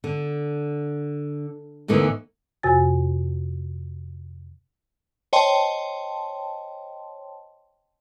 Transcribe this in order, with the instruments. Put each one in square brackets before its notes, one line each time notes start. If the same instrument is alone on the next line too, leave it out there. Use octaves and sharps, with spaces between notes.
[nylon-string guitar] D3
E2 A2 D3 E3 A#3 D#4
[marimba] F2 C3 F#4 G#5 A6
[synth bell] C5 C#5 D#5 G5 A5 C6